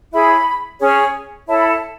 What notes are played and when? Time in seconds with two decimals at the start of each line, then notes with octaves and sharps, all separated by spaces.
0.12 E4 G#4 C#5 B5
0.79 C#4 G#4 C#5
1.47 E4 A4 C#5 A5
1.57 B5
1.67 A5